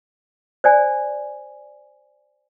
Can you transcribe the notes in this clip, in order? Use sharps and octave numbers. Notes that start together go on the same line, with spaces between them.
C5 D5 G#5